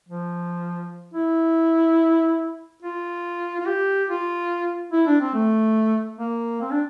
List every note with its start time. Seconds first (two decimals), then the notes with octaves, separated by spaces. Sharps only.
0.09 F3
1.14 E4
2.82 F4
3.60 F4
3.66 G4
4.09 F4
4.92 E4
5.07 D4
5.21 C4
5.34 A3
6.19 A#3
6.61 C4
6.72 D4